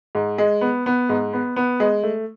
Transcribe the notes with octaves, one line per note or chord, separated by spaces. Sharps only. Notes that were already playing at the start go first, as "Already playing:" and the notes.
G#2
G#3
B3
B3
G#2
B3
B3
G#3
A3